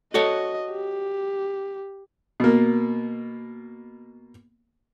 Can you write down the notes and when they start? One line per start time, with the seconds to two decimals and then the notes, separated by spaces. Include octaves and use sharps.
0.14 F#4 A4 C#5 D#5
0.72 G4
2.40 B2 A#3